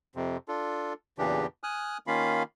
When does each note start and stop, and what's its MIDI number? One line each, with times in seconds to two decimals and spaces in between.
0.15 0.37 41
0.15 0.37 48
0.48 0.93 62
0.48 0.93 65
0.48 0.93 69
1.18 1.46 40
1.18 1.46 46
1.18 1.46 49
1.18 1.46 52
1.18 1.46 62
1.18 1.46 67
1.63 1.98 80
1.63 1.98 87
1.63 1.98 89
1.63 1.98 90
2.07 2.43 51
2.07 2.43 58
2.07 2.43 61
2.07 2.43 65
2.07 2.43 77
2.07 2.43 83